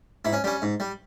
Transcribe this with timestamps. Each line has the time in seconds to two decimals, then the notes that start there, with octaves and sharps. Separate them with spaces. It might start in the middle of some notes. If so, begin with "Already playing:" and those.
0.25 G#2 E4
0.33 C#4
0.44 G3 C#4
0.62 G#2
0.80 G3